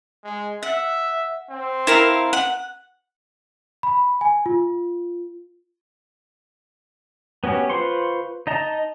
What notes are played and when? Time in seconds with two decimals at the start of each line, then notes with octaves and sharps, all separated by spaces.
0.24 G#3
0.63 E5 F#5
1.50 C4
1.87 E4 A#4 F5
2.33 F#5
3.83 B5
4.21 G#5
4.46 F4
7.44 B3 C#4 F#4 G4
7.70 F4 B4 C5 C6 C#6
8.47 D#4 D#5 A5 A#5